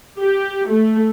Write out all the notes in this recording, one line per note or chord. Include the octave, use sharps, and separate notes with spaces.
G4
A3